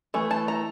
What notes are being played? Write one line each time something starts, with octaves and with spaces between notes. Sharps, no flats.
E3 A3
A5
A#5